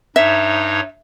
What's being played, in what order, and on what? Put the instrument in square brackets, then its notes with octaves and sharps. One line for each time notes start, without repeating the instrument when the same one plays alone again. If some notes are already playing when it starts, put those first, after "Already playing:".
[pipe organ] G2 D#4 C#5 [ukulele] E5